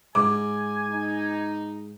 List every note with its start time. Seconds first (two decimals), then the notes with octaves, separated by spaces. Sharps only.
0.15 G#2 G#5 D6
0.89 D#4